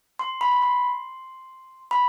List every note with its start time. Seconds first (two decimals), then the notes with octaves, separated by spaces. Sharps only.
0.19 C6
0.41 B5
0.52 B5
0.62 C6
1.91 B5